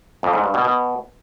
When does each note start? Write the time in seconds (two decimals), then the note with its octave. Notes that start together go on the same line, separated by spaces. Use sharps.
0.23 F2
0.33 G#2
0.44 G2
0.54 B2
0.64 B2